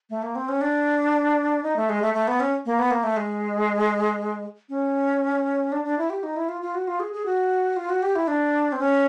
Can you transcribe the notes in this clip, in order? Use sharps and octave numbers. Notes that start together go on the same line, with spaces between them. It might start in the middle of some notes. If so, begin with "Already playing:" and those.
A3
A#3
C4
C#4
D4
D#4
A3
G#3
A3
A3
B3
C#4
A#3
B3
A#3
A3
G#3
C#4
D4
D4
E4
G4
D#4
E4
F4
F4
F#4
F4
G#4
G#4
F#4
F4
F#4
G4
E4
D4
C4
C#4